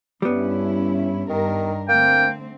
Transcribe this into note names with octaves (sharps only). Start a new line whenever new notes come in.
G2 G3 B3 C#4 E4
G2 D#3 D4 A#4
D3 A3 A#3 C4 G5